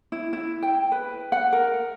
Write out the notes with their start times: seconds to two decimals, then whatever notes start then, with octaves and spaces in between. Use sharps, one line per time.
0.12 E4
0.33 E4
0.62 G5
0.92 B4
1.32 F#5
1.53 A#4